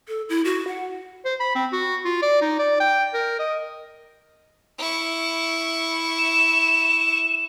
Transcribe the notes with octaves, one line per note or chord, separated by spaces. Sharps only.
A4
E4
F#4
F#5
C5
B5
C4
F#4
F4
D5
D#4
D5
G5
A#4
D#5
E4 C#6
E7